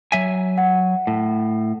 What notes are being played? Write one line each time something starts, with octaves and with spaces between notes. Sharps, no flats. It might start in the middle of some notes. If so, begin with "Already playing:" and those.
F#3 E5 G#5
F#5
A2